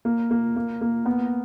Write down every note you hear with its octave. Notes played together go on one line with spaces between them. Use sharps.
A#3
A#3
A#3
A#3
B3